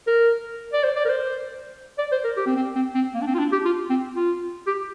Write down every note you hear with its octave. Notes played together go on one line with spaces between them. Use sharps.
A#4
D5
C5
D5
A#4
C5
D5
C5
A#4
G4
C4
C4
C4
C4
A#3
D4
C4
F4
D4
G4
F4
C4
F4
G4